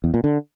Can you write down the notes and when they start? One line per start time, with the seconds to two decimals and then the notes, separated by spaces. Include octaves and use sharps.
0.04 E2
0.14 A#2
0.24 D3